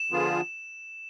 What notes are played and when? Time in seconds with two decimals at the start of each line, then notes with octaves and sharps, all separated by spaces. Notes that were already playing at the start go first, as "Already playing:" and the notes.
Already playing: E7
0.11 D3 F3 B3 F4 G#4